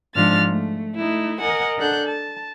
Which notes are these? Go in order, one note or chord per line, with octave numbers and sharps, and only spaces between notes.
G#2 F3 D4 F6 A6
A3
A3 D#4 E4
A#4 D#5 F#5 G#5
D4 A4 F#5 F#6 G6
A5